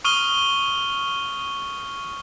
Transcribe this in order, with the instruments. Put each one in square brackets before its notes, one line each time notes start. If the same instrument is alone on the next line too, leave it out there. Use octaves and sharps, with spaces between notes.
[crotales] C#6 D#6 F6 D#7 G7